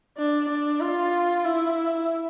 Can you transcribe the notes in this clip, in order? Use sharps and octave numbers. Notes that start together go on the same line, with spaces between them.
D4
D4
F4
E4